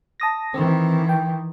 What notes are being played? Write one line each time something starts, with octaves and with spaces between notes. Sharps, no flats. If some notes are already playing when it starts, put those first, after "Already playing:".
A5 D#6 A#6
D#3 E3 C4
G5